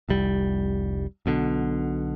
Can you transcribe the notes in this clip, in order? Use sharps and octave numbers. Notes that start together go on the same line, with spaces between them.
F1 C2 G3
B1 B2 D3